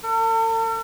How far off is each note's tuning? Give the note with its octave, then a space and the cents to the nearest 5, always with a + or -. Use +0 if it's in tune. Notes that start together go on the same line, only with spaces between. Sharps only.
A4 +45